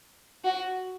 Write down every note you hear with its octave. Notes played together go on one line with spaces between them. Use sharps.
F#4